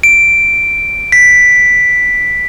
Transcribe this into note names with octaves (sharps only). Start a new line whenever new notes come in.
D7
B6